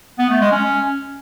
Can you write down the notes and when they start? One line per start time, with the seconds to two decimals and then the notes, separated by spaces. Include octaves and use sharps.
0.19 B3
0.30 A3
0.41 G#3
0.51 C#4